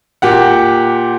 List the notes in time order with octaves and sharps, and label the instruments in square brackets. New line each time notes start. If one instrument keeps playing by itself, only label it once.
[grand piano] A#2 G4 F#5